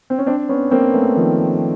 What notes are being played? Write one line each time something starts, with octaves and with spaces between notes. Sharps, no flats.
C4
C#4
C4 D4
B3 C#4
A#3 C4
A3 B3
D#3 F3